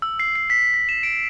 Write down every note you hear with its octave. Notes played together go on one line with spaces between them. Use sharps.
E6
C7
C7
B6
A#6
E7
D7